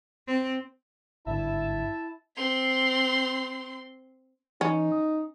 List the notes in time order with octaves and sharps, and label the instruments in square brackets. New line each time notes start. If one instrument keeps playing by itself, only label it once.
[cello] C4
[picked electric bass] G#1 G2 D3 [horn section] E4 E5 A5
[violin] C4 C6
[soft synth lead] E3 [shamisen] C#4 [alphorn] D#4
[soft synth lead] D#6